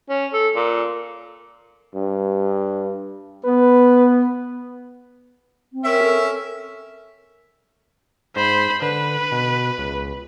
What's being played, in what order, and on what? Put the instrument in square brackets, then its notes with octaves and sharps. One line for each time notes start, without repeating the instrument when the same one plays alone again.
[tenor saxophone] C#4
A4
A#2
[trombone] G2
[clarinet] B3 [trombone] B4
[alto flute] C4
[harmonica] C#4 E5 [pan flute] A#4
[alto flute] A4
[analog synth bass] G#2 [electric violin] C5 B5
[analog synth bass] D3 [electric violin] B4
[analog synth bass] B2
C#2